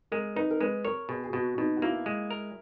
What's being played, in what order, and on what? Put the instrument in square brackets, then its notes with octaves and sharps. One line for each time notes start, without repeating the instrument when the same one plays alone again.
[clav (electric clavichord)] G#3 [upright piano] A#4
[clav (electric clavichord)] D#4 [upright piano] B4
[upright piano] A#4
[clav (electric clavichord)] G#3 [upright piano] B4
[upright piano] A#4 [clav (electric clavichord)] C#5
[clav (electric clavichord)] B2 [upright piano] G#4
[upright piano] G#4
[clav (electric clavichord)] B2 [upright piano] F#4
[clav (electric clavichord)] B2 [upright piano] D#4
[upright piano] F#4
[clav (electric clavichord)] A#3 [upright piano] E4
[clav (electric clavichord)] G#3
A#4